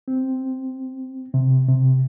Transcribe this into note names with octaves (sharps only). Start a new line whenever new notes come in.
C4
C3
C3